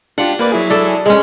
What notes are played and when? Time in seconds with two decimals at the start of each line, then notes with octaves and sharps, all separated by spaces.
0.18 D4 F4 G4 F#5
0.39 A#3 B4 D5
0.52 F#3 E4 G#4
0.70 D4 A4
1.06 G#3 C#4